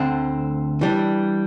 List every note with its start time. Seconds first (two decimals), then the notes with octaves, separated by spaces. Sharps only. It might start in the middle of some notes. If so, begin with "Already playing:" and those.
Already playing: D2 D3 A3 C4
0.81 E3 G3 D4